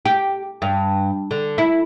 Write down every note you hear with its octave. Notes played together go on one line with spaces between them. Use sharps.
G4
G2
D3
E4